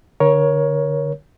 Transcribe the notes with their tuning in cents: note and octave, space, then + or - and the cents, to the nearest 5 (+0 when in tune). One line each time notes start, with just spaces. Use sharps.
D3 +0 A#4 +25 C#5 +0